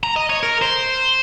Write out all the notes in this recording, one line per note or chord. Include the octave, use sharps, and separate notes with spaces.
A#5
D#5
C#5
A#4
C5